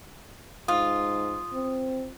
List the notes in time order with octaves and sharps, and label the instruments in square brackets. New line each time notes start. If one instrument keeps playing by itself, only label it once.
[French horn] G#2 [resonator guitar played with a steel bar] F4 [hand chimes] D#6
[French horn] C4